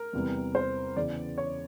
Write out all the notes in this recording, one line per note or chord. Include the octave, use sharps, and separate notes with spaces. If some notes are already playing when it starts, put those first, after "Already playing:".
Already playing: A#4
E2 C3 E3 G3
C5
E2 C#3 E3 D5
C#5